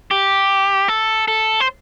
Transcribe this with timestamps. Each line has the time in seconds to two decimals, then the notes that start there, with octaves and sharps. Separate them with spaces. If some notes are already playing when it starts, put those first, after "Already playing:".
0.11 G4
0.88 A4
1.28 A4
1.60 C5